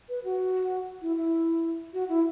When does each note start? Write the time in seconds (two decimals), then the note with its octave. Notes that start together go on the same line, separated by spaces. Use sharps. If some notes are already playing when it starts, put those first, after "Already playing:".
0.09 B4
0.24 F#4
1.01 E4
1.16 E4
1.93 F#4
2.09 E4